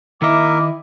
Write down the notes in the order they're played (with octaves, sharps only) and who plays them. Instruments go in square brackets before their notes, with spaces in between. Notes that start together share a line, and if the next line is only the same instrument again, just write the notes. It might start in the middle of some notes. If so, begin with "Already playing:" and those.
[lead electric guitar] D#3 D#5 [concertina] A#3 A#4 E5 [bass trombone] E4 [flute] D6